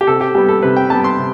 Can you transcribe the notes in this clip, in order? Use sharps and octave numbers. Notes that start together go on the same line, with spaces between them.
G4
C3 A4
G4
G3 B3 G4
A4
C3 B4
G5
G3 B3 A5
C6
C3